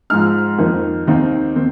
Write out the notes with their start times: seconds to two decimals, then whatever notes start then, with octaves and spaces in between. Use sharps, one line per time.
0.10 G#2 F3 G#3 D#4 F6
0.58 F2 D#3 A#3 D#4
1.07 D#2 D#3 C4 D#4
1.56 D#3 C4